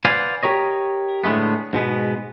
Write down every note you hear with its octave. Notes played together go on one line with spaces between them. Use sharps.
B4 C5 D5 F5 F#5 G#5
G4 A#4 C#5 D#5
A2 D3 G#3 A3 B3
G#2 B2 G#3 B3